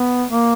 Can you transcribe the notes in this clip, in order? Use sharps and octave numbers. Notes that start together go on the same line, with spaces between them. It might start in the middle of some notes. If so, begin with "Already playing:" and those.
Already playing: B3
A#3